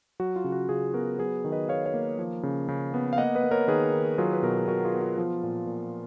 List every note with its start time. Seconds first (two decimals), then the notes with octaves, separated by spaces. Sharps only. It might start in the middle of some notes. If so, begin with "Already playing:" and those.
0.20 F#3 F#4
0.36 F4
0.44 C#3
0.52 F#4
0.69 C#3 F4 G#4
0.94 B3 F#4 A#4
1.18 F#3 G#4 B4
1.45 D#3
1.52 B4 D#5
1.69 D#3 C#5 F5
1.85 C#5 F5
1.94 A#3
2.19 F3
2.43 C#3
2.68 C#3
2.94 B3
3.13 F5
3.18 A#3 D#5 F#5
3.35 B4 D#5
3.44 A#3
3.51 A#4 C#5
3.68 D#3 G#4 B4
3.93 D#3
4.18 F#3 F4 G#4
4.33 B4
4.43 B2 F#4 A#4
4.57 G#4
4.67 B2 F#4 A#4
4.85 F4 G#4
4.94 B3
5.01 F4
5.18 F3
5.43 A#2
5.67 A#2